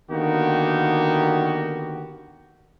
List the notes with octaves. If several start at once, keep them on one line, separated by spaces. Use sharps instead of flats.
D3 D#3 A#3 B3 F#4 G4